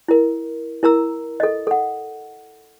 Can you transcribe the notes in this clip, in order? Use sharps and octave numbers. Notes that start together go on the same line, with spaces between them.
E4 A#4
E4 A#4 A#5 E6
A4 D#5
A4 F#5